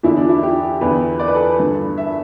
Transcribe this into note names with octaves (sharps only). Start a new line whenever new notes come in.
E2 D3 E4
D4
E4
G4
E2 D3 B4
D5
B4
A4
B4
G2 D3
E5